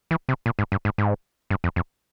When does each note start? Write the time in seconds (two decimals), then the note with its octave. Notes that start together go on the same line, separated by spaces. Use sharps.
0.11 E3
0.29 C3
0.46 A#2
0.59 G#2
0.72 G2
0.85 G#2
0.98 G#2
1.50 G2
1.64 F2
1.76 F2